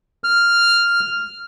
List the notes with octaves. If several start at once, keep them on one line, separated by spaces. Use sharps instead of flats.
F6